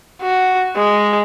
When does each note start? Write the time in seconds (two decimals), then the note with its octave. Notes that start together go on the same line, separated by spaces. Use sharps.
0.22 F#4
0.77 G#3